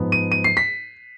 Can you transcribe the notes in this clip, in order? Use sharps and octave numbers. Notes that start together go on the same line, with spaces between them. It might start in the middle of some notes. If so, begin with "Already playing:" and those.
Already playing: G#2 F3 B3
D#7
D#7
C7
B6